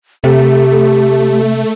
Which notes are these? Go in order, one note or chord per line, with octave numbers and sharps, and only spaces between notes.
C3 A3 G4